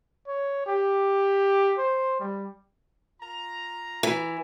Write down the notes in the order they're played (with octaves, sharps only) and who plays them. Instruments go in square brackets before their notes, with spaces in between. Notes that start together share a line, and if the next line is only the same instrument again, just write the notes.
[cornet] C#5
G4
C5
G3
[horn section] F4 A#5
[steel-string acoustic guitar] E3